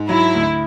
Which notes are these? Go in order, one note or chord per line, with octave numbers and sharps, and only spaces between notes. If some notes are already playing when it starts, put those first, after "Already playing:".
Already playing: G#2
F#3 E4
D2